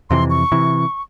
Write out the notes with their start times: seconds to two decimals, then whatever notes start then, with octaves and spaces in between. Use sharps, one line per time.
0.10 F2 C3 E3 C6
0.30 C#6
0.52 C3 E3